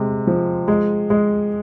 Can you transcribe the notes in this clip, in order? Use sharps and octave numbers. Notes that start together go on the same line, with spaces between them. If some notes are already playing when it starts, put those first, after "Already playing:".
Already playing: C3 G#3
F3
G#3
G#3